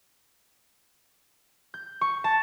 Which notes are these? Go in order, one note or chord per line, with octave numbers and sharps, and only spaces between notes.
G6
C#6
A5